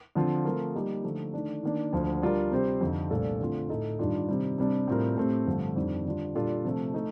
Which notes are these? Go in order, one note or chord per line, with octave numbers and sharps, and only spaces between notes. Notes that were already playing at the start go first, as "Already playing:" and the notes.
D3 F3 C4 F4
F3 A3 C4 F4 A#4
G3 A#3 D#4 G4
D3 F3 A3 D#4
D#3 A3 D4
D#3 A#3 D4
D2 D3 F3
G3 D4 F4 A#4 D5
C3 G3 C4 G4 C5
F2 D3 F3 C4 D#4
C2 A#2 A3 D4 A4
D3 A3 C4 F4
A2 A3 D#4 A4 D#5
G2 D#3 G3 D4 F4
C3 D#3 G3
C3 G3 D4
A2 G3 C4 F4 A#4
A2 A3 C4 G4
G2 D3 F3 A3
F2 D#3 G3 D4
D3 G3 D4 F4
A#2 G3 D4 F4 A4
C3 F3 A3
A3 D#4